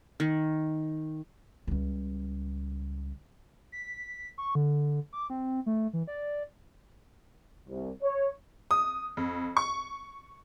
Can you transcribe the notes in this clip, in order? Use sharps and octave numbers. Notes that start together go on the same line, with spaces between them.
D#3
C#2 G3
B6
C#6
D3
D6
C4
A3
E3
D5
C2
C#5
D#6
F2
C#6